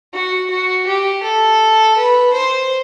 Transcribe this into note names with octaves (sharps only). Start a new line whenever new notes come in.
F#4
F#4
G4
A4
B4
C5